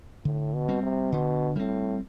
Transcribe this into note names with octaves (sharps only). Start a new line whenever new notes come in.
A2 D3
B2
G3 C4
C3
B2 D3
A2 G3 C4